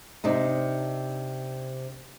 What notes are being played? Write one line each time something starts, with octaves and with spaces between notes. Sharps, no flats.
C3 D4 D#4